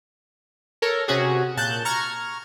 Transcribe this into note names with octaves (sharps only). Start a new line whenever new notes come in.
A4 A#4 C#5
C3 C#4 F#4 G#4
A#2 A5 F#6 G6
A#5 C#6 F6 G#6